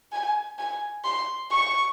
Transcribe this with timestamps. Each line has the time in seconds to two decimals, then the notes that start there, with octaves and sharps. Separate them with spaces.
0.12 G#5
0.58 G#5
1.04 C6
1.50 C#6